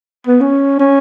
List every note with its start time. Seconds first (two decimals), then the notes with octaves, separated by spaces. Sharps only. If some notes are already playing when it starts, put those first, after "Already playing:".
0.27 B3
0.41 C#4
0.80 C#4